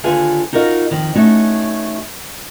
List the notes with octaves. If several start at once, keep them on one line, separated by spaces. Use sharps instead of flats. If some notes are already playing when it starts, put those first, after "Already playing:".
D#2 D3 F4 G#4 B4 G#5
D#4 F4 F#4 A#4 D#5
F2 D#3
A3 C#4 D#4 F#4